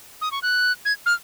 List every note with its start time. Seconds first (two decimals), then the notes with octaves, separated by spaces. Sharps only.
0.21 D#6
0.32 C#6
0.42 F#6
0.85 G#6
1.06 F6